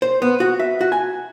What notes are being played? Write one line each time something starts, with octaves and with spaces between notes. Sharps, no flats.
C5
B3
F#4
E5
F#4
G#5